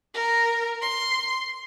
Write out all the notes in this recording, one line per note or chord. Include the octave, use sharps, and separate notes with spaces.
A#4
C6